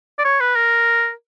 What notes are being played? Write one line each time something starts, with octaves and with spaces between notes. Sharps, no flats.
D5
C#5
B4
A#4